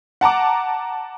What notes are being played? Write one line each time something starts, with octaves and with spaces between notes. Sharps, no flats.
F#5 A5 A#5 D6